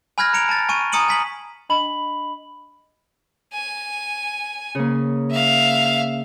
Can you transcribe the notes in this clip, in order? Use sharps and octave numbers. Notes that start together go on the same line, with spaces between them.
G#5 B5 F6 F#6 G#6 A#6
A#5 C#7 D7 F7
A5 A6
G#5 C#6 D#7
G#5 A#5 D#6 C#7 D#7 F#7
G#5 B6 F#7
D4 D#5 B5 F#7
G#5
C#3 A#3
E5 F5